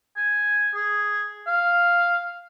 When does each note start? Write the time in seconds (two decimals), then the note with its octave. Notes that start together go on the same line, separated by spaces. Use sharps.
0.17 G#5
0.75 G#4
1.47 F5